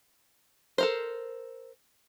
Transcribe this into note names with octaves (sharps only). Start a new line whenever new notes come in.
A4 A#4 C5